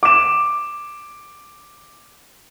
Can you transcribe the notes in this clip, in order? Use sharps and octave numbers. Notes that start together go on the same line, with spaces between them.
D6 E7